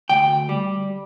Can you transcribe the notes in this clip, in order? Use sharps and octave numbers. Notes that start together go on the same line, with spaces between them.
D2 G5
G3